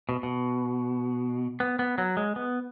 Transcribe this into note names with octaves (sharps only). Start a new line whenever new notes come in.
B2
B2
B3
B3
F#3
G#3
B3